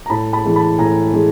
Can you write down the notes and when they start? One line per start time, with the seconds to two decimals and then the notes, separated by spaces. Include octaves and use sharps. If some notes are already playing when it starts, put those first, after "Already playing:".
0.06 A#5
0.10 A2 A5 B5
0.33 A5 B5
0.44 E3 G#3
0.56 A5 B5
0.79 A2 G#5 A#5
1.13 E3 G#3